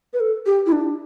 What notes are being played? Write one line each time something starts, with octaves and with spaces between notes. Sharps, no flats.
B4
A4
G4
E4
D4